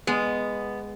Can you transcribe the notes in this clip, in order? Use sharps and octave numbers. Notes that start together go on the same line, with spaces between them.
G#3 B3